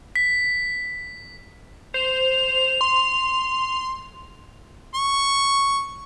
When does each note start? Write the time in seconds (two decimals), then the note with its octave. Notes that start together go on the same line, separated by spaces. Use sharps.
0.16 B6
1.94 C5 F7
2.81 C6
4.94 C#6